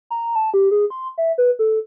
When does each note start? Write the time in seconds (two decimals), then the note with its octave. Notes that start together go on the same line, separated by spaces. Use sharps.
0.10 A#5
0.35 A5
0.54 G4
0.71 G#4
0.90 C6
1.18 E5
1.38 B4
1.59 A4